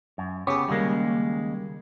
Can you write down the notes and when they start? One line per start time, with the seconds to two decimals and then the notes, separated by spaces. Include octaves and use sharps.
0.18 F#2
0.47 C#3 B3 C#4 G4 G#4
0.68 D#2 C#3 G3 G#3 A#3